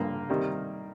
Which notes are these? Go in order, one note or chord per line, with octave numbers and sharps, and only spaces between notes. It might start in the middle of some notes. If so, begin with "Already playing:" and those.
Already playing: G2 D3 F3 A#3 A#4
C3 D#3 G3